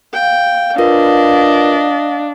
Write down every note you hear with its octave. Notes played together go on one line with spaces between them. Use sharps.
F5 G5
D4 F4 A#4 B4 D#5